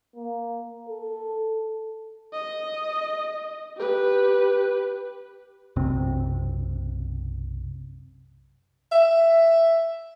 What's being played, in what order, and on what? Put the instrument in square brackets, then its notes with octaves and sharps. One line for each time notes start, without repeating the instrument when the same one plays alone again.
[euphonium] A#3
A4
[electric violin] D#5
G4 B4
[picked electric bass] B1 F#2 C3 C4
[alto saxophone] E5